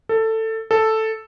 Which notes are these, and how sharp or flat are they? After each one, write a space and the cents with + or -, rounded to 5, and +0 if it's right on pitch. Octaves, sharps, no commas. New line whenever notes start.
A4 +15
A4 +0